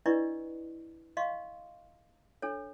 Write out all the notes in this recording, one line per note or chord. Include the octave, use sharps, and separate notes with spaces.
D4 E4 B4 D5 D#5 C#6
D#5 F5 C6 C#6
D4 A4 C#5